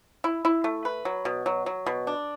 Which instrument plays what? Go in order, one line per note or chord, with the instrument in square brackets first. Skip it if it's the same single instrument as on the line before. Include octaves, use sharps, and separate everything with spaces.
[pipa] E4
E4
A3
B4
F#3
B2
F#3
F#3
B2
D4